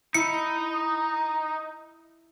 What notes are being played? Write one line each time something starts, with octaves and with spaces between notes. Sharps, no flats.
D#4 E4 C#7